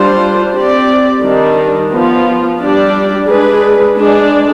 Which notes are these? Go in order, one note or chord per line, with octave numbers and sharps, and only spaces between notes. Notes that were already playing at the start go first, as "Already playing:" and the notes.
Already playing: G3 D4 F4 C5
C4 G4 D5
D#3 G3 D4
F3 B3 F4
G3 D4 G4 D5
G#3 D4 G#4 B4
G#3 D4 G#4 D5